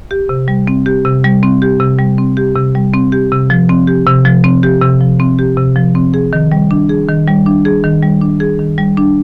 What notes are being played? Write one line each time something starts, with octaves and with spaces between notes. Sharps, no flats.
G4
C3
G3
C4
G4
C3
G3
C4
G4
C3
G3
C4
G4
C3
G3
C4
G4
C3
F3
C4
G4
C3
F3
C4
G4
C3
F3
C4
G4
C3
F3
C4
G#4
D#3
G3
D4
G#4
D#3
G3
D4
G#4
D#3
G3
D4
G#4
D#3
G3
D4